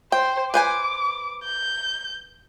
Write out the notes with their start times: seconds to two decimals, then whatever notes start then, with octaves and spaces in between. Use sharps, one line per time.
0.12 C5 G5
0.54 B4 C5 G#5 D6
1.44 G6